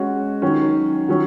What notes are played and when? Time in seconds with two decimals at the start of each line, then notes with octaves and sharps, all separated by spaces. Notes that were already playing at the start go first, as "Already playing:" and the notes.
Already playing: G#3 C#4 F#4
0.42 D#3 F#3 C#4
1.08 D#3 F#3 C#4